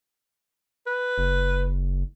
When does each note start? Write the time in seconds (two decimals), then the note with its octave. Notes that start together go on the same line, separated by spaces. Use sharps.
0.87 B4
1.18 F#1